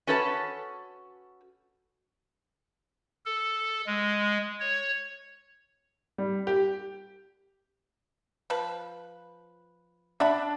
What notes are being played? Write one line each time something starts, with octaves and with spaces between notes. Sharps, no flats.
C#4 F#4 A4 B4 D#5 A5
A4
G#3
C#5
G3
G4
F3 B4
D4 E5 F#5 B5